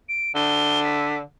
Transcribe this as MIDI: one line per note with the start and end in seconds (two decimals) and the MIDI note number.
0.09 0.32 98
0.35 1.21 50
0.35 0.82 103
0.84 1.16 95